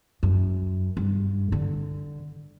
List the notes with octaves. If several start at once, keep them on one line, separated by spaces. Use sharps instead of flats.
F#2
G2
D3